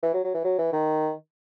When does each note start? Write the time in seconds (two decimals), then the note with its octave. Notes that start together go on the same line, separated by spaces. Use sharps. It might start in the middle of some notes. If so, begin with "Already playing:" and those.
0.03 E3
0.14 F#3
0.24 F#3
0.34 E3
0.44 F#3
0.58 E3
0.72 D#3